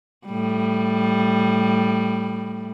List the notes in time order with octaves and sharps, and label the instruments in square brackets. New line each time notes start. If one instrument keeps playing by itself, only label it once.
[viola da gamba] A2 G3